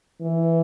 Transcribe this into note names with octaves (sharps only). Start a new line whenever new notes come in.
E3